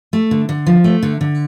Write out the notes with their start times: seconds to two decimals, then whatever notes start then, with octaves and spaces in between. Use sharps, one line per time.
0.13 A3
0.31 D3
0.49 D3
0.67 F3
0.84 A3
1.03 D3
1.21 D3